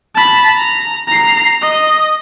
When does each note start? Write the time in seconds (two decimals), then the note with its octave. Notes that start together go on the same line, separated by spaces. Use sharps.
0.15 A5 B5
0.57 A#5
1.08 A#5 C7
1.62 D#5